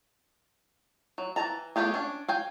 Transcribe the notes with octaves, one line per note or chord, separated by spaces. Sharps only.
F#3
E3 F3 A5 A#5
A3 B3 F4 G4 G#4
C#4 D4
F5 G5 G#5